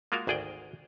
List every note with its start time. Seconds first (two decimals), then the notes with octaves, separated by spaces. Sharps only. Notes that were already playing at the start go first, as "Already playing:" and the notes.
0.12 G#3 A#3 F4 F#4 A#4 F5
0.27 G#1 D2 G#4 D5 G5